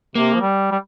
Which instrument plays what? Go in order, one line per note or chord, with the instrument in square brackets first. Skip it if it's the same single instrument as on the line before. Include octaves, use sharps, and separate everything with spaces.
[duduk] C3 [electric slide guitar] A#3
[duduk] F3
G3
G3